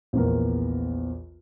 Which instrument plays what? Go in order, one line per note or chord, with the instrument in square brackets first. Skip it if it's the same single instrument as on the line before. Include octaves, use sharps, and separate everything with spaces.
[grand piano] A#1 E2 A#4